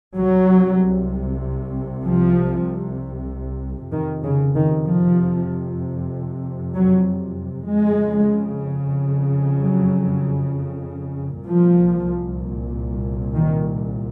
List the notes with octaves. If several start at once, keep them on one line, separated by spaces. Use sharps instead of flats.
C2 C3 F#3
F3
F2 C3 D#3
C#3
D#3
F3
F#3
F2 C#3 G#3
F#3
C2 A#2 F3
D#3